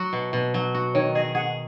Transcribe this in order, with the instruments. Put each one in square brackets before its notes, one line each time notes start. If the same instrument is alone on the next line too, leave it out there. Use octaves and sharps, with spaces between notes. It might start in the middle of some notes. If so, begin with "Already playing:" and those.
Already playing: [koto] F#3 F#4
B2
B2
F#3
F#4
[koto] D#3 [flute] C#5
[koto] G#4 [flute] D#5
[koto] G#4 [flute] F#5